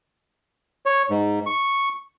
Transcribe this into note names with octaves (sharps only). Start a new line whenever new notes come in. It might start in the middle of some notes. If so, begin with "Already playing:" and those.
C#5
G#2
C#6